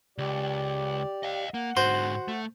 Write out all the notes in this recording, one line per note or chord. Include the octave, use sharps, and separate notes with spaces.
C#2 G4 D5
D#5 F5
A#3 F#5
G#2 D3 F#4 C5 C6
A3